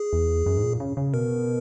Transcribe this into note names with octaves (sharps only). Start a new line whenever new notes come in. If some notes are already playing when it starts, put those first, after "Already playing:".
Already playing: G#4
E2
F#2
G#2
A#2
C#3
C#3
B2 A#4